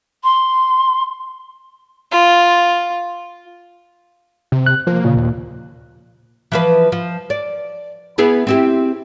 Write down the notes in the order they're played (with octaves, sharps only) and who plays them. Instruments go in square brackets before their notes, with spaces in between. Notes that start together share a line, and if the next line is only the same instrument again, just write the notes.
[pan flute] C6
[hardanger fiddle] F4
[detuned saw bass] C3
[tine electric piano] F#6
[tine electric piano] F3 [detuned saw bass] A#3
[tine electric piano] A#2 [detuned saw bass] C#3
[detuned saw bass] D#2
[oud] E3 F3 B4
F3
D5
B3 E4 G#4
C4 E4 G4